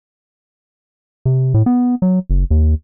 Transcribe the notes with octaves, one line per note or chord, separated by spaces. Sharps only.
C3
A2
B3
F#3
F#1
D#2